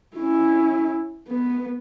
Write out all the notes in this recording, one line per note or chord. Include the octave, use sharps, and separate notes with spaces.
C#4 E4
B3